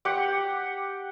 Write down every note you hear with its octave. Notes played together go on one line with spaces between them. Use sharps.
G4 F#5